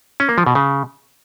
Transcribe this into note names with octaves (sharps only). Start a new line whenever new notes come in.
C#4
A#3
F3
B2
C#3